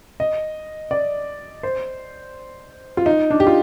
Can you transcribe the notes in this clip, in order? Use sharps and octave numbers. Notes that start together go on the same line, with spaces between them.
D#5
D5
C5
F4
D#4
D4
G4
F4